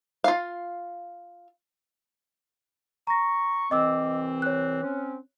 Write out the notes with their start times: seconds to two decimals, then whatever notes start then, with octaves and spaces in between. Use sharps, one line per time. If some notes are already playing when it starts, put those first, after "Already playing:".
0.24 F4 F5
3.07 A#5 C#6 A#6
3.71 C2 E3 C4 D#5 D6 E6
4.42 C#5 F#6
4.83 C4 C#4